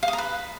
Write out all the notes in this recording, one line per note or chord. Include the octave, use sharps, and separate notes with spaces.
F5
D#6
A#5
B4